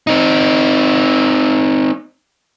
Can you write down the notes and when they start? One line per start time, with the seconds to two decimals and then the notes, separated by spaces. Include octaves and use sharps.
0.07 C4 D#4